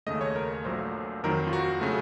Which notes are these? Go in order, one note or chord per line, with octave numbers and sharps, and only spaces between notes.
D#2 C#3 A3 D#5
C#5
A#4
A#1 A#2 F#3 A3 C5
F2 D#3 F#3 A#4
F4
F#4
C#3 A3